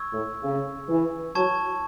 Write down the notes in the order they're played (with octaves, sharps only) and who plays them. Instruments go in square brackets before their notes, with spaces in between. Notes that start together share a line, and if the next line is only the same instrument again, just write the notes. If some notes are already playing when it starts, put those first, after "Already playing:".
Already playing: [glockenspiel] C#6 E6 G#6
[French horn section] A2
C#3
E3
[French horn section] F#3 [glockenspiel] A5 C#6 G#6